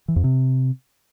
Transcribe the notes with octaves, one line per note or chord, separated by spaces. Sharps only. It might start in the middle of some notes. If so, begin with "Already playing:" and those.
E3
F2
C3